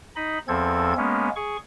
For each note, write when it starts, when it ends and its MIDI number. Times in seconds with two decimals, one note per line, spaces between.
0.16 0.38 63
0.16 0.38 75
0.16 0.38 83
0.48 0.94 40
0.48 0.94 53
0.48 0.94 60
0.48 0.94 69
0.48 0.94 92
0.97 1.29 56
0.97 1.29 58
0.97 1.29 59
0.97 1.29 61
1.36 1.57 68
1.36 1.57 85